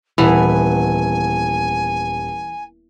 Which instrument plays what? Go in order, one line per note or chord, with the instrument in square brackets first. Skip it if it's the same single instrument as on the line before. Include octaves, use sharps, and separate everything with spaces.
[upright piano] D#1 [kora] E3 B3 [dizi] G#5